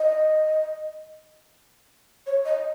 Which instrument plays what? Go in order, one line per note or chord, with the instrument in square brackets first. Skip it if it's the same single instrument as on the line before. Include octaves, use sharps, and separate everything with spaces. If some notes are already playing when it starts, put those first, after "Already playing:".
Already playing: [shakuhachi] D#5
C#5
D#5